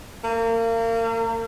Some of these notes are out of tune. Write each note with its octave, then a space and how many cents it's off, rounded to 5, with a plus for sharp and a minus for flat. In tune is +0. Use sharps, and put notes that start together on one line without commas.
A#3 -35